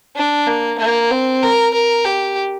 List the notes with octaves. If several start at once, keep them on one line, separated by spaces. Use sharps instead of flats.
D4
A#3
A#3
C4
A#4
A#4
G4